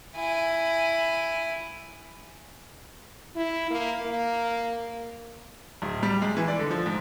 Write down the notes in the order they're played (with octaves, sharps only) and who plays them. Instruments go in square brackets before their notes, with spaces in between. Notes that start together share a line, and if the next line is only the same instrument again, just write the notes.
[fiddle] E4 G#5
[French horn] E4
A#3
A#3
[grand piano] D1
G3
G#3
E3
D5
D3
F3
G#2